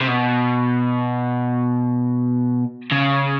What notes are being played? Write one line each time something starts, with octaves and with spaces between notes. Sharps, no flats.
C3
B2
C#3